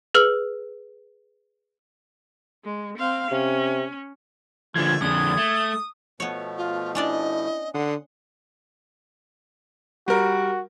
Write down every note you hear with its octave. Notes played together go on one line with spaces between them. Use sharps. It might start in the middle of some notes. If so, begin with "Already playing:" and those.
G#4 B4 E6 F6 F#7
G#3
C4 F5
C3 C#4
D3 F3 A3 G#6
F2 D3 D#6
A3
B2 F3 A3 B3 C#5
F4
C#4 D4 E4 D5 D#5
D3 F#5 C6 D#6
G3 F#4 A#4